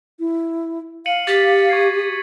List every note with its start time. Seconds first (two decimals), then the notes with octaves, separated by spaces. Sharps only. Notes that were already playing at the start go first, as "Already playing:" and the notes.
0.19 E4
1.06 F5 C#7 D#7 F#7
1.27 G4 A6 B6
1.70 C#6 G#6 C7